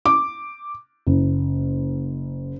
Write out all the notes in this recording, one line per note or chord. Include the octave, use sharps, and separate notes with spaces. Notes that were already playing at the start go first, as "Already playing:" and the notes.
D6
F#1